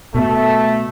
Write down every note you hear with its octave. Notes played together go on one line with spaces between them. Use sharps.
B2 A3